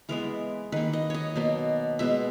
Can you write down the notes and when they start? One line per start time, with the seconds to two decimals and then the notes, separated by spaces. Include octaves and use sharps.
0.09 E3 G#3 B3 A#4
0.72 D#3 A#3 B4
0.93 D#5
1.10 C#5 D#5
1.36 B2 F#3 A#3
1.99 B2 G#3 B3 E5